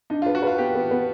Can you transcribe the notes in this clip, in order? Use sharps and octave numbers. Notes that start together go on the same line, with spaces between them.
D4 D#4
F4
B4
F#4
F4 B4
B3 G4
B3
B3